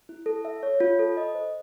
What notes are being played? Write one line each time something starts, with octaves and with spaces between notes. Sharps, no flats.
E4
A4
E5
C#5
F4
A4
D#5
C5